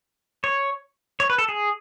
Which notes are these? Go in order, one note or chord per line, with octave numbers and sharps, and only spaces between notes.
C#5
C#5
B4
A4
G#4